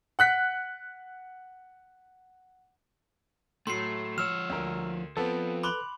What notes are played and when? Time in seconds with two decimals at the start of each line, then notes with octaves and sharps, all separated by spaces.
0.19 F#5 F#6 B6
3.67 A2 F#3 A3 C6 C7
4.18 F3 C#5 E6 F6 E7
4.50 D2 A#4
5.17 F3 B3 C4 A4 B4
5.63 B5 C6 D6 F#6 G7